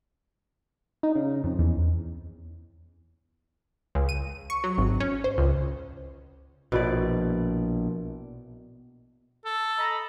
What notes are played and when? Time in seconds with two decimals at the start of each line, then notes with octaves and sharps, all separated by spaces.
1.03 D#4
1.16 C#3
1.44 F2
1.59 E2
3.95 C#2
4.09 D#7
4.50 C#6
4.64 F#3
4.78 G#1
5.00 C#4
5.24 C5
5.38 C#2
6.72 A#1 B2 E4 D5
9.45 A4
9.79 D#5 A#5 B5